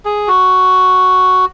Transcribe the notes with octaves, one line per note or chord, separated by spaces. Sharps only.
G#4
F#4